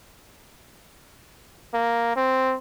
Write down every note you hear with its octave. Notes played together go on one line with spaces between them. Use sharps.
A#3
C4